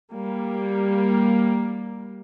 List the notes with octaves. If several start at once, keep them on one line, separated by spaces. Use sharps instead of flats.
G3 A#3